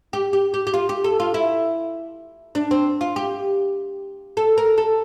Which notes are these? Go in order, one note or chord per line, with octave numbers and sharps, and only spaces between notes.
G4
G4
G4
G4
F4
G4
A4
F4
E4
D4
C4
F4
G4
A4
A#4
A4